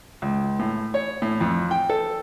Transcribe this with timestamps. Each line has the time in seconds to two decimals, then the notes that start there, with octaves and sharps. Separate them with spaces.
0.22 C#2
0.59 A2
0.94 C#5
1.22 A2
1.41 F2
1.71 G5
1.90 A4